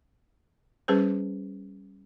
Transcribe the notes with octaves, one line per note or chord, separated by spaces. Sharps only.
G3 C#4 G#4 B4 C5